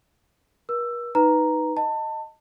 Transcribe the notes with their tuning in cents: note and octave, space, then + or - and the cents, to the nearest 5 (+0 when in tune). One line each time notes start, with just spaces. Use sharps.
A#4 +45 E6 +15
D#4 +0 B4 +0 A#5 +0
D#5 +0 A5 +25